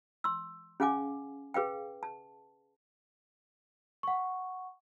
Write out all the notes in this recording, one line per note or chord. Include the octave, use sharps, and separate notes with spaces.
C6 E6
C#4 G#4 F5 F#5 G#5 D6
G#4 B4 F5 G5
A5
F#5 C#6